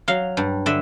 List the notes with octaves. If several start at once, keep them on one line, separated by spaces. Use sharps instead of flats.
F#3 F5
G2
D3 E5